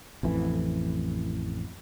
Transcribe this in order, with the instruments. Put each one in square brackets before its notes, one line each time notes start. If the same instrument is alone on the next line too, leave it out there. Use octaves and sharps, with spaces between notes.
[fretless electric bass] A1 F2 E3